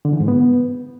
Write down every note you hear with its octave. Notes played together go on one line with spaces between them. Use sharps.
D3
E3
G#2
B3